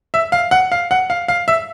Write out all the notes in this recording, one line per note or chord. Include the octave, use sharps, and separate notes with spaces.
E5
F5
F#5
F5
F#5
F5
F5
E5